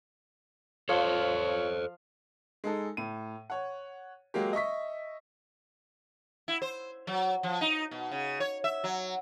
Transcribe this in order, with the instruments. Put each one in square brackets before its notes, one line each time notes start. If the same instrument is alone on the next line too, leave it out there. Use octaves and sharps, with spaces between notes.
[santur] F3 F5 [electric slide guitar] A4 C5 [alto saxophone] C#5
[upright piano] G#3 D#4 A4
A2 D#7
C#5 F#5
F#3 G#3 A#3 G4
D#5 E5 C#6 B6
[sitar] E4
C5
F#3
F3
D#4
B2
C#3
C#5
E5
F#3